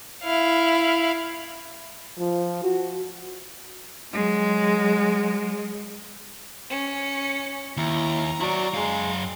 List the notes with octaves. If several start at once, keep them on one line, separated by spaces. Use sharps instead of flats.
E4 F5
F3
F#4
F#3 G#3
C#4 C#7
D#2 E4 A#5
F#3 E4 D5
F#2 G#3 F5